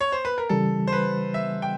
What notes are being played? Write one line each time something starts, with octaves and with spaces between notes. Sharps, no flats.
C#5
C5
B4
A#4
C#3 E3 G3 A4
C5
B4
E5
G5